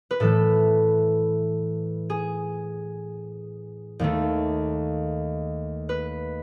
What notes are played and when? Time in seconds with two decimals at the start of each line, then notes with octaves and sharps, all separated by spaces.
0.11 B4
0.20 A2 E3 A3 A4
2.10 G#4
3.99 D#2 D#3 A3
5.89 B4